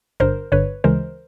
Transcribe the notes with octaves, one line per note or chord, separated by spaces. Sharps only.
G1 G2 D3 A#4 C5
G1 G2 D3 B4 C#5
D2 C#3 E3 G#3 A#4 C5